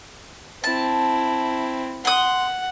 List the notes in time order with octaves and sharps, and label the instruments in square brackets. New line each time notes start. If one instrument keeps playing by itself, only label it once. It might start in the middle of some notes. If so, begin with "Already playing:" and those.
[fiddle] C4 E4 [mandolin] A5
[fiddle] F#5 [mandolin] C6 D#6